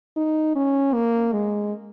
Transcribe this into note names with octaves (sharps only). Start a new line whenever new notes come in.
D#4
C#4
A#3
G#3